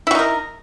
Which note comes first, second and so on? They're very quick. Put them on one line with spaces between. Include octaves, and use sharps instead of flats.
E4 F#4 D#4 A#4